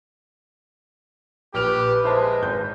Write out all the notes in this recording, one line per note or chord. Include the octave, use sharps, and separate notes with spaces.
A#1 G4 B4 F6 F7
G#3 E4 C5 A5
G#1 G6